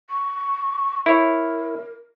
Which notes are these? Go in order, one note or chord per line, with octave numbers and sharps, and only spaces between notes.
C#6
E4 A#4 C#5